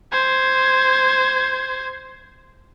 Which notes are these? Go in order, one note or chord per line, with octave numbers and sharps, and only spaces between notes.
C5 G#6